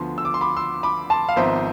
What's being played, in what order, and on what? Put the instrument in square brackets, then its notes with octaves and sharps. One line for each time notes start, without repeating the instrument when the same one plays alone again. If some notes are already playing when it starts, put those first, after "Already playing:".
Already playing: [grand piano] D2 D3 F3 B3 C6
E6
D6
C6
B5 D6
C6 E6
B5 D6
A5 C6
F5
G#1 G#2 F3 B3 C5 E5